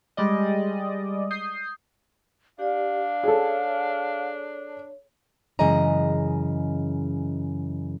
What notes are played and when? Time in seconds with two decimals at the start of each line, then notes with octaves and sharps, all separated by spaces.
0.17 G3 G#3 D5 D#5
1.31 D#6 G6 C7
2.59 D4 G4 D5 F5
3.23 G#4 A4 C#5
5.59 F#2 C#3 E3 G#3 D#5 A#5